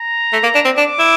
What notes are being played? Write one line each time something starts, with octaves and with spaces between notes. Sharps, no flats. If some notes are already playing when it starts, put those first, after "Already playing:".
Already playing: A#5
A3
A#3
D4
C4
D4 D6
E4